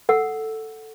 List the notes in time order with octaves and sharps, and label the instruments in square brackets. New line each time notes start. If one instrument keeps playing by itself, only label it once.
[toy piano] A4 F#5 E6